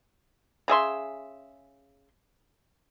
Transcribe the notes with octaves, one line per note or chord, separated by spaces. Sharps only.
C#3 G#4 E5 C6